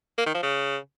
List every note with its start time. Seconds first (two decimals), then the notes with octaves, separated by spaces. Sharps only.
0.18 A#3
0.26 D#3
0.35 F3
0.43 C#3